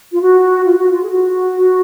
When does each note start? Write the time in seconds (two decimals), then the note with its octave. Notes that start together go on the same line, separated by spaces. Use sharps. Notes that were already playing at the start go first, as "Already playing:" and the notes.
0.12 F4
0.21 F#4
0.65 F4
0.78 F#4
0.91 F4
1.03 G#4
1.10 F#4